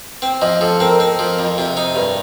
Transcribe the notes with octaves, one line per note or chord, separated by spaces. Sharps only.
C4 G5
F3 D#5
F3 A4
C4 A#4
C4 A#4
F3
F2
C3
D#4
G2